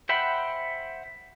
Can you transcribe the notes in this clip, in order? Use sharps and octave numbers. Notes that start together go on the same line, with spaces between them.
C5 E5 F#5 G5 B5